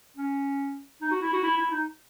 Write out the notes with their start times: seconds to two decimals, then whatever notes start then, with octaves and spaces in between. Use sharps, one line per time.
0.17 C#4
1.01 D#4
1.11 F#4
1.22 E4
1.33 F#4
1.43 E4
1.57 E4
1.71 D#4